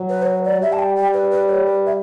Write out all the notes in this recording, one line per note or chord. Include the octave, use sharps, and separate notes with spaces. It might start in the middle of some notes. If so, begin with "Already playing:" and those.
Already playing: F#3
B4
C#5
B4
D5
G3 E5
A5
G5
G5
B4
B4
C#5
B4
E5